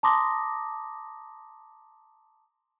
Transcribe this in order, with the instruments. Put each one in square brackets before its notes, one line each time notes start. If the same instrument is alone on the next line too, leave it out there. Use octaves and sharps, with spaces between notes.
[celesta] A5 A#5 C6 D6 D#6 A#6